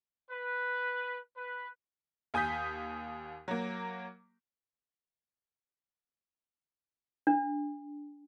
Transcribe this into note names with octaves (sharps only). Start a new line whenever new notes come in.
B4
B4
D#2 G#5 D#6 G6 B6
F#3 A#3
D4